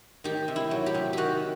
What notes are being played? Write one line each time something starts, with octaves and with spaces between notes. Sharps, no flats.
D#3 G4
C3
E4
F#3
G4
C3
D#3 F#4 G4